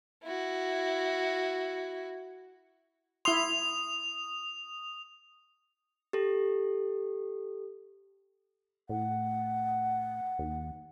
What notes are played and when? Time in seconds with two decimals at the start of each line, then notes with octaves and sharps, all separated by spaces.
0.23 E4 F#4
3.25 E4 C6 D#6 F7
6.13 G4 A4
8.89 A2 F#5
10.39 D#2